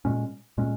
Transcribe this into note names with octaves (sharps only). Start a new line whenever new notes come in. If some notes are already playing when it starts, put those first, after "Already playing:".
A#2 G#3 C#4
A#2 G#3 C#4